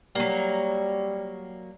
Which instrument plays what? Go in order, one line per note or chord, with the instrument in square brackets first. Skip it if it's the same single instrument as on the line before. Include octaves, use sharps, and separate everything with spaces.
[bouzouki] F#3 A#3 [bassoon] G3